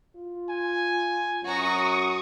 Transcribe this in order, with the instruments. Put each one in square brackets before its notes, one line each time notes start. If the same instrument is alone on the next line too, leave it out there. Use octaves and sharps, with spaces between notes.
[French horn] F4
[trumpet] G#5
[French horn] F#2 [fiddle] F#4 A#5 [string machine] C#6 D#6